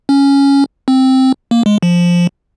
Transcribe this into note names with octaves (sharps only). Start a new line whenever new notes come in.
C#4
C4
A#3
G#3
F3